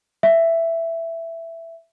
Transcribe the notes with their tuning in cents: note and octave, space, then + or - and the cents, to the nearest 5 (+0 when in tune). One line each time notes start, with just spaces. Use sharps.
E5 +10